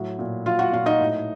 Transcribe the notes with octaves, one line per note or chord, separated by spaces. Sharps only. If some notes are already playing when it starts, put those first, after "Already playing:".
Already playing: A2 F#3
A#2
F#3 F4 F5
F#4 F#5
A#2 F4 F5
D#4 D#5
A2